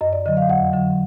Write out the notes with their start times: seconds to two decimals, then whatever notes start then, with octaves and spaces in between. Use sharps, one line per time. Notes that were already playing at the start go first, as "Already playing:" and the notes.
0.01 F#2 D#5
0.13 D5
0.26 D3 F#3 D#5
0.37 F5
0.49 F2 F#5
0.73 D3 F#3